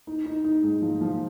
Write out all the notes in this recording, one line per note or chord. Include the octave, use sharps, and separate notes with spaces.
D#4
D#4
D#4
G#2
F3
F3